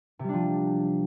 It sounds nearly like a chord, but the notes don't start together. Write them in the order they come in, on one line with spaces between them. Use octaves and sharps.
C3 G3 D4 F3